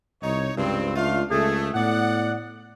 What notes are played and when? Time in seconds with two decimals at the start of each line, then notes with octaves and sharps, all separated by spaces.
0.23 C2 D#4 C#5
0.57 C#2 G2 C4
0.96 A3 D4 F4 F5
1.31 C#2 A3 G#4
1.74 A2 B3 D5 F#5